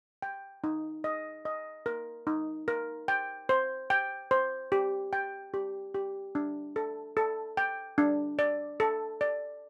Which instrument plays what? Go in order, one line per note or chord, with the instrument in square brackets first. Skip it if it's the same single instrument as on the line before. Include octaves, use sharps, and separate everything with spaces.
[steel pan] G5
D#4
D#5
D#5
A#4
D#4
A#4
G5
C5
G5
C5
G4
G5
G4
G4
D4
A4
A4
G5
D4
D5
A4
D5